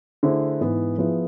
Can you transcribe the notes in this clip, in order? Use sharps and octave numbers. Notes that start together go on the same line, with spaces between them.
D3 A3 E4 G#4 C5
G#2 E3 B3
F3 B3 E4 G#4 B4